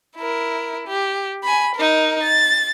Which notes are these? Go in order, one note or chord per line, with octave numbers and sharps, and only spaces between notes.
E4 A#4
G4
G#5 B5
D#4 A#4
A6